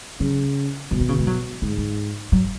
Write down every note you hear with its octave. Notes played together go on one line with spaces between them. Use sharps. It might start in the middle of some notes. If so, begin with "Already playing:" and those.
C#3 F#3
B2 F#3
D#3
C#3
G#3
F#3
G#2 G#3
G#3
F#3